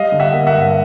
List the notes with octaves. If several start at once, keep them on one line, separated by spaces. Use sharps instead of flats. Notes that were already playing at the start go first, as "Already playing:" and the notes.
Already playing: G3 D#5 F5
D3
E5 F#5
A#3
E5 F#5
G2